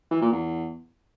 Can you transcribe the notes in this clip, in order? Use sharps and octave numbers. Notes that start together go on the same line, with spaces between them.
E3
A#2
E2